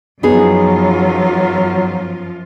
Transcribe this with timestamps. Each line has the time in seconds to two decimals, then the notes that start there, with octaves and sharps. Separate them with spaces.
0.23 F#2 F3 F#3 B3 D#4 F4 G#4